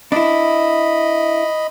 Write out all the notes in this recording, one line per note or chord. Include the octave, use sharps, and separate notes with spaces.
D4 E4 D#5 B5